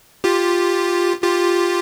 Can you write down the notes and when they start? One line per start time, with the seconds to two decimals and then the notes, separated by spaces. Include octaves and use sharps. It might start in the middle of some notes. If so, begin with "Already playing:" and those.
0.24 F4 G4
1.22 F4 G4